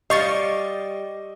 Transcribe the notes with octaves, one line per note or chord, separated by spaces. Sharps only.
G3 D#5 F5 C#6 A6